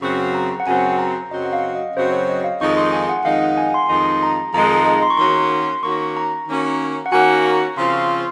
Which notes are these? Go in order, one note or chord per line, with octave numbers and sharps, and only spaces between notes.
F#2 C#3 F#3 C4 F#4 C#6
A#5
F#5
F#2 C#3 F#3 C4 F#4 G#5
A#5
F#2 C#3 F#3 C4 F#4 D#5
F#5
F5
D#5
F#2 C#3 F#3 C4 F#4 C5
C#5
D#5
F5
F2 D#3 G#3 D#4 C#6
C6
G#5
F#5
F2 D#3 G#3 D#4 F5
F#5
G#5
C6
F2 D#3 G#3 D#4 C6
A#5
F2 D#3 G#3 D#4 A#5
A#5
A#5
C6
C#6
D#3 A#3 C#4 F#4 C6
D#3 A#3 C#4 F#4 C#6
A#5
D#3 A#3 C#4 F#4
F#5
D#3 A#3 C#4 F#4 G#5
A#5
C#3 F3 C4 F4 C6
C#6
C6